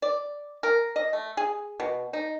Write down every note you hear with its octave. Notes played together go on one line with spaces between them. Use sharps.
D5
A#4
D#5
A3
G#4
B2
D#4